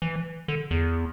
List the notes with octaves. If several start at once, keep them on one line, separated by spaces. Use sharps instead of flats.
E3
D3
E2